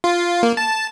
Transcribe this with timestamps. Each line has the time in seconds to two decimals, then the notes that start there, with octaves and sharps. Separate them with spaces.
0.04 F4
0.43 A#3
0.57 A5